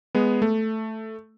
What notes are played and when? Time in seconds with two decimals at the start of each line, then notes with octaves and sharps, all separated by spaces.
0.15 G#3 B3
0.42 A3